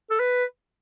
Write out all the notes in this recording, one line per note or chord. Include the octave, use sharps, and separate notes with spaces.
A4
B4